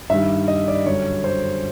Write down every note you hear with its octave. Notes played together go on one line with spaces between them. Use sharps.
G2 D#3 G3 E5
D#5
D5
F#2 D3 G3 C#5
C5